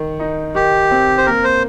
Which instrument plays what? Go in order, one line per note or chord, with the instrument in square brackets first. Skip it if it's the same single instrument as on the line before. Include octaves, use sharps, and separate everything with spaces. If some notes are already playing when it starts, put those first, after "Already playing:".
Already playing: [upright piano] D#3
D#4
[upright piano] D#3 [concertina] G4
[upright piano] C4
[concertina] C5
[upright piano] A#3 [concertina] A#4
[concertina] C5